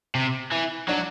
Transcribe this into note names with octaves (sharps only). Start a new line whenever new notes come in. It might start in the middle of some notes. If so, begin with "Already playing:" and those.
C3
E3
F#3 D4